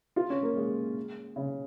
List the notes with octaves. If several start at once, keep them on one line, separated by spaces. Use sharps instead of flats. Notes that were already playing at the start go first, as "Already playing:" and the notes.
F4
C#4
A#3
G#3
C#3